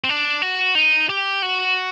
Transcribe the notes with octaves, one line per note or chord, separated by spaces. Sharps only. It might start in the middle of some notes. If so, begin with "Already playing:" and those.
C4
D4
F#4
D#4
G4
F#4